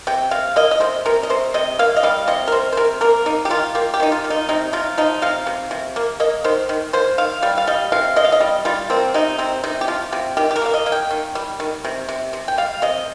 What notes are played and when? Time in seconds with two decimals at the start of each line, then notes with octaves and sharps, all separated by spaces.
0.07 C3 G5
0.31 C3 F5
0.56 A#3 D#5
0.71 D#5
0.80 C3 C5
1.06 C3 A#4
1.23 D#5
1.30 C3 C5
1.54 C3 D#5
1.79 A#3 F5
1.96 D#5
2.03 G3 F5
2.28 C3 D#5
2.48 A#4
2.52 C3 C5
2.72 C5
2.77 C3 A#4
3.01 A#3 A#4
3.26 A#3 D#4
3.45 G4
3.50 D#3 F4
3.75 A#3 G4
3.94 G4
4.00 D#3 D#4
4.12 F4
4.24 D#3
4.30 D#4
4.49 C3 D#4
4.73 C3 F4
4.98 F3 D#4
5.22 C3 F5
5.46 C3
5.71 C3
5.96 A#3
6.20 A#3 D#5
6.44 D#3 C5
6.69 D#3
6.93 A#3 C5
7.18 D#3 F5
7.42 G3 F5
7.58 F5
7.67 G3 D#5
7.92 C3 F5
8.16 C3 D#5
8.24 F5
8.32 D#5
8.41 G3
8.65 G3 F4
8.90 A#3 C4
9.14 C3 D#4
9.38 C3 C4
9.64 C3 D#4
9.81 G4
9.88 F3 F4
10.13 C3 G4
10.37 D#3 G4
10.51 G4
10.56 A#4
10.62 A#3 F5
10.74 D#5
10.86 A#3
10.92 G5
11.11 D#3
11.35 G3
11.60 D#3
11.85 C3
12.09 C3
12.33 C3
12.48 G5
12.58 G3 F5
12.82 C3 D#5